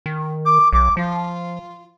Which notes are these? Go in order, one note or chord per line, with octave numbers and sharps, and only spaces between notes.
D#3
D6
B1 D6
F3 F4